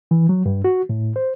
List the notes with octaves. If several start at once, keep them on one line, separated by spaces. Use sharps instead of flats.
E3
F#3
G2
F#4
A2
C5